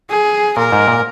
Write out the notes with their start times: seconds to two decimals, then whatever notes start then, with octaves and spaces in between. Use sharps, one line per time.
0.10 G#4
0.57 A#2 A#4
0.72 G#2
0.88 A#2